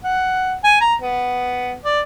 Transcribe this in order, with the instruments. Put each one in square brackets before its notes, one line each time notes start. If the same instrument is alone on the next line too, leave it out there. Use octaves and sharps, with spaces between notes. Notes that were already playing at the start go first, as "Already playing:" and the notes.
[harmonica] F#5
G#5
A#5
B3
D5